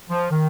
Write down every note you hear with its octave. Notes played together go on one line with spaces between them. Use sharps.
F3
D#3